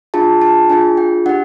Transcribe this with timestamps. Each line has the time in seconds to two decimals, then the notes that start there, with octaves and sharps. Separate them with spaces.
0.14 D4 F4 G#4 A5
0.41 A5
0.70 D4 F4 G#4 G#5
0.97 G5
1.26 D4 G4 F#5